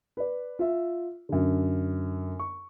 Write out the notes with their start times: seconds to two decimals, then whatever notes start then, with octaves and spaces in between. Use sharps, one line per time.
0.17 B4 D5
0.59 F4 E5
1.29 F#2 D3
2.39 C#6